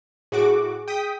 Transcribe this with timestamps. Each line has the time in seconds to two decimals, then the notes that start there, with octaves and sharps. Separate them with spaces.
0.32 A2 F#4 G#4 D6
0.88 G5 D#6 B6